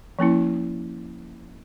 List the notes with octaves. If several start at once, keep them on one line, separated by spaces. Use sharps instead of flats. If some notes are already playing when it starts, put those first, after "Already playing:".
F3 A#3 C#4 E4